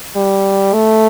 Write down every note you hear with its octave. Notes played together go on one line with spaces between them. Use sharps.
G3
A3